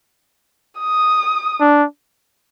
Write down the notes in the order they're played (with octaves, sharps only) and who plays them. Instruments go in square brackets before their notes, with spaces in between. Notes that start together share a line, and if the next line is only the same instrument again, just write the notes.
[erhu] D#6
[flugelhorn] D4